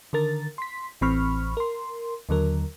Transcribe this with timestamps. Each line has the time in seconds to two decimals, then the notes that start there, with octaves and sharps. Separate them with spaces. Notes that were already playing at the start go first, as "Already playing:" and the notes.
0.13 D3 D#3 A#4 A6
0.58 C6 B6
1.01 A1 E3 C4 B5 C#6 F6
1.57 A#4 C6
2.29 D#2 D3 F#3 A#4